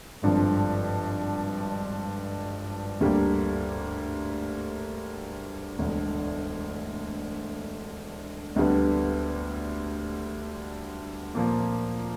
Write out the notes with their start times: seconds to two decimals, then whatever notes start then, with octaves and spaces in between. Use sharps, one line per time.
0.22 G#1 G2 D3 F3
3.01 D2 D3 G3 A#3
5.79 E1 D2 D3
8.56 D2 D3 G3 B3
11.35 A#2 F3 A#3